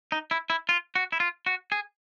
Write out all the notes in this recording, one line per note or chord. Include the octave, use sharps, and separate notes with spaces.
D#4
E4
E4
F4
F#4
E4
F4
F#4
G#4